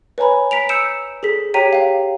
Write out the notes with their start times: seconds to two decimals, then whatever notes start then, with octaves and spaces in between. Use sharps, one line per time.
0.18 B4 C#5 G#5 A#5 B5
0.51 A#5 B6 D7 F7
0.69 E6 G6 C#7 D7 E7
1.23 G#4 A4 B6
1.54 G4 C#5 G5 A#5 B6 D#7
1.73 F5 G5